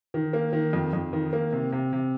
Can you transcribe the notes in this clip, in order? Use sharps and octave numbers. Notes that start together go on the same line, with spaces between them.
D#3
A#3
D#3
F2
F2
D#3
A#3
C3
C3
C3